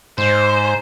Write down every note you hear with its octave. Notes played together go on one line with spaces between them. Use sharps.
G#2 C5